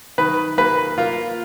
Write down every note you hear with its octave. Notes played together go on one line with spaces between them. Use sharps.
D#3 B4
A#3 B4
A#3 F4